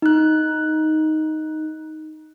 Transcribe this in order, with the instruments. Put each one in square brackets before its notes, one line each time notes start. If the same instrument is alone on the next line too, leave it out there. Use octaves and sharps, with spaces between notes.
[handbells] D#4 F#6